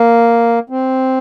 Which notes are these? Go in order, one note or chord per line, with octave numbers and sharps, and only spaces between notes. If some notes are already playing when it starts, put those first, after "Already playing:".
Already playing: A#3
C4